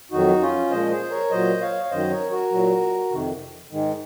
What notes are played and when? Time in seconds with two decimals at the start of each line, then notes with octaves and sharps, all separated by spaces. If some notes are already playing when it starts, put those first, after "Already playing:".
0.11 F2 D#3 F#3 D#4 F#4
0.41 C#4 F4
0.71 A#2 F3 G#3 C5 D#5
0.91 G#4 C5
1.11 A#4 C#5
1.31 A#2 F#3 C5 D#5
1.62 C#5 F5
1.84 C#5
1.91 F#2 D#3 F#3 C5 D#5
2.10 A#4 C#5
2.31 F#4 A#4
2.51 A#2 F#3
3.11 F2 C3 D#3
3.71 G#2 D#3 G#3